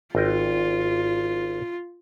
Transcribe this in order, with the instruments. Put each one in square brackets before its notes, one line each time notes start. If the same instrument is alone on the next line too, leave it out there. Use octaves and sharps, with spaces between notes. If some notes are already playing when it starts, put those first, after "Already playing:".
[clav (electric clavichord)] G#1 D#5 G5 [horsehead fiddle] F4